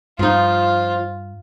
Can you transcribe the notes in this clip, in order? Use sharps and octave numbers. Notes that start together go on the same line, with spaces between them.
G2 F3 D#4 F4